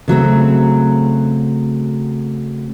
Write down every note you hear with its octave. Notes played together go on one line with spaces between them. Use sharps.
C#3 F#3 A3 C4